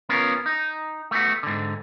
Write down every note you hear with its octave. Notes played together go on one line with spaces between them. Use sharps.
B3 C#4 F4 A#4
D#4
A3 B3 F#4
G#2 D3